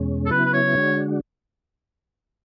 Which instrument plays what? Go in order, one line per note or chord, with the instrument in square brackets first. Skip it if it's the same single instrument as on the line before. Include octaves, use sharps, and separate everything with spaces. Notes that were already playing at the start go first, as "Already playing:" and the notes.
Already playing: [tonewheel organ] E2 B2 G#3 C#4
[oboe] A4
[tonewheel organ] C#3 F#3 B3 E4 [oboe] B4
[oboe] B4
C#5
[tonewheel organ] D3 G#3 D4 F#4